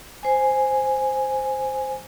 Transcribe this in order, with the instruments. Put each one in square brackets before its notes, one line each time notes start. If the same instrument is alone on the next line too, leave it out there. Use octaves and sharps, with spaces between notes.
[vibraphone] C5 G#5